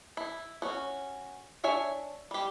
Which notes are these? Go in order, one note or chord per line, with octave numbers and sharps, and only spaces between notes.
E4
C#4 F#4
D4 C#5 E5 G#5
G3 G4